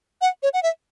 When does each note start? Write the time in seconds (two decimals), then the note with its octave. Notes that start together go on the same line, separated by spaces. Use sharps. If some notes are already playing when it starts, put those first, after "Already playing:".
0.21 F#5
0.43 C#5
0.53 F#5
0.63 E5